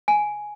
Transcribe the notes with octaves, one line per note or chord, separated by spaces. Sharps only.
G#5